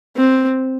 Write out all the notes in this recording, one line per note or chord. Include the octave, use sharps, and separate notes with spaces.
C4